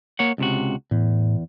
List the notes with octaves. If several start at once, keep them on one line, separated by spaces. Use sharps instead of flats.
A#3 C#5 F#5
C#2 C3 F#4
E2 A2